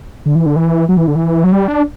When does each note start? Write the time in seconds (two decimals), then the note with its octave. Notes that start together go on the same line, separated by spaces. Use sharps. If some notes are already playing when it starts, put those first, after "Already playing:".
0.26 D3
0.35 E3
0.46 D3
0.56 E3
0.89 F#3
0.97 E3
1.07 D3
1.15 E3
1.44 F#3
1.52 G3
1.68 D4